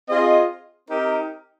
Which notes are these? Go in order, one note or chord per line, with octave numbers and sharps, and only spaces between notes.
C4 F4 G#4 D#5
C4 D#4 G4 A#4